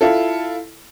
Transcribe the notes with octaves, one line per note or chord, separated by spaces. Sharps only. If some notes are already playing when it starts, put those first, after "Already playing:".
E4 F4 A4